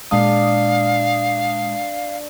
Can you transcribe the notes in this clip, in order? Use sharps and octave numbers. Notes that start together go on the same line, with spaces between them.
A#2 G#3 D4 F5 D#6